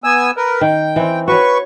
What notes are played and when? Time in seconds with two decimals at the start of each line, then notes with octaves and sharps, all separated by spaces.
0.04 B3 G#5 E6
0.37 A#4 B4
0.61 D#3 G5
0.96 E3 C4
1.28 F#4 B4 C#5 C#6